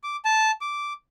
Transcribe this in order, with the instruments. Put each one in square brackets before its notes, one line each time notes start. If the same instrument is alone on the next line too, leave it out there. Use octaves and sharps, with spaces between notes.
[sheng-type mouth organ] D6
A5
D6